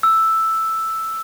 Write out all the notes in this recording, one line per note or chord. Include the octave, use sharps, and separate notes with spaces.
E6